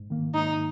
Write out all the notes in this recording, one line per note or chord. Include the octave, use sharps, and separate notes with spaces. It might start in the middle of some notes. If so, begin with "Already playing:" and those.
Already playing: G#2
D#3 A#3
G#2 D#4